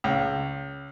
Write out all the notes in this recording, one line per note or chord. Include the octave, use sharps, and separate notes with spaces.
C#2